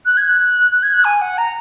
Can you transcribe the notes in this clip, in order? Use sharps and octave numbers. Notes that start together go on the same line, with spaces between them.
F#6
G#6
F#6
F#6
G#6
F#6
G#5
F#5
A#5